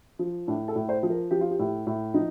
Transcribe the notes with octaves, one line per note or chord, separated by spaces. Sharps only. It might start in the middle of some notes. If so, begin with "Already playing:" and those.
F3
A2 D4
A4
A2
C5
F3
A#4
F3 G4
F4
G4
A2
A2
F3 D#4